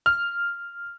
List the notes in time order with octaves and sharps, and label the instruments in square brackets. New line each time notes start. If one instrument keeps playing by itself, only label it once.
[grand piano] F6